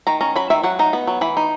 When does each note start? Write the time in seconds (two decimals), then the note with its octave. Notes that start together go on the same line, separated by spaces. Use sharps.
0.07 D#3 A#5
0.21 C#4 A#5
0.35 F#3 B5
0.50 D#3 E5
0.63 F#3 F#5
0.79 D#4 A#5
0.93 B3
1.07 F#3
1.21 E3 B5
1.37 D#4